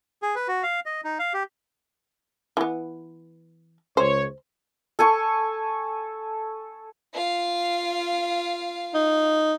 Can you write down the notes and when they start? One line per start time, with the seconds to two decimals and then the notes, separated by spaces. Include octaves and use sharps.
0.22 G#4
0.35 B4
0.48 F#4
0.63 F5
0.86 D#5
1.04 D#4
1.19 F5
1.34 G4
2.57 E3 B3
3.97 C#2 C5 C#5
4.99 A4 G#5 C#6
7.14 F4 F5
8.94 D#4